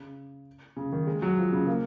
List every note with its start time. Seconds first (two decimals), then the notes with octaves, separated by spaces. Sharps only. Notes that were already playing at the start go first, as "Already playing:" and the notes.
Already playing: C#3
0.77 C#3
0.92 D#3
1.07 G#3
1.22 F#3
1.38 F3
1.52 C#3
1.67 A#3